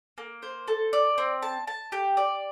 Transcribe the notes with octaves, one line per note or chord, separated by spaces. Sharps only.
A#3
C5
A4
D5
C4
A5
A5
G4
D5